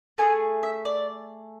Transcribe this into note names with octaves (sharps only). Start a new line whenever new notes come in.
A3 D4 G#4 G#5
E5
D5